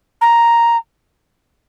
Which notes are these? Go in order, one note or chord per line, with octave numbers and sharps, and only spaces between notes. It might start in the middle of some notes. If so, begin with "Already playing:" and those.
A#5